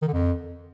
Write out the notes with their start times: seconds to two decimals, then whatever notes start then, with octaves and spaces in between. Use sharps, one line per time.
0.02 D#3
0.08 D3
0.13 F2